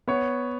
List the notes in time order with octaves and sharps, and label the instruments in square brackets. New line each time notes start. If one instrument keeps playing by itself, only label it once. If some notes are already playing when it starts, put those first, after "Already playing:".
[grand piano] B3 C#5